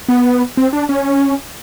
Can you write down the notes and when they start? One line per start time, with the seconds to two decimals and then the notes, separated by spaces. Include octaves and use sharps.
0.09 B3
0.57 C4
0.73 D4
0.89 C#4